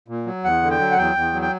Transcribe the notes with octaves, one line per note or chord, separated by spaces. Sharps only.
A#2
F#3
E2 F#5
D3
G5
F#3
F#5
E2 G5
E2
F#3
G5